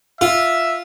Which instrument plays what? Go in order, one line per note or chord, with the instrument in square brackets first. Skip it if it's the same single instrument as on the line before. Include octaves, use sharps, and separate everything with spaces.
[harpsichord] F4 [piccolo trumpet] E5